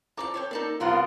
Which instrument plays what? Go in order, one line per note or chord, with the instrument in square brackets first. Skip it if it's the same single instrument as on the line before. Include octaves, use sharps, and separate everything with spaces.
[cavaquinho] A4 D5 A5 [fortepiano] A#5 D6
[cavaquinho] A4 C#5 G5
[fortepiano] A#3 [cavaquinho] D#4 A4 D5
[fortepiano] C2 C4 [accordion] B3 F4 [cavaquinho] A4 A#4 F#5